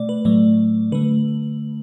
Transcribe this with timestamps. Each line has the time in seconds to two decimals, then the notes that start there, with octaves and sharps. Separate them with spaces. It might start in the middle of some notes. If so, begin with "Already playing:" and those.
Already playing: B2 A3 D5
0.09 B4
0.25 A2 F#3 A3 D5
0.92 D3 A3 B4